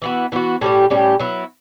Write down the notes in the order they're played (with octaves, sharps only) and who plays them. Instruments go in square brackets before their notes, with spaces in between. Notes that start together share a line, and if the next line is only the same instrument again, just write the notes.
[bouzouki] E3 B3 F#4
E3 B3 F#4
A2 G3 C#4 G4
A2 G3 C#4 G4
F#3 B3 E4